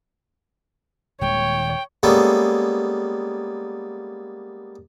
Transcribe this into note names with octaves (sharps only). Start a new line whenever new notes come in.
D#1 D#3 G#3 C#5 G5
G3 G#3 A#3 B3 C#4 A4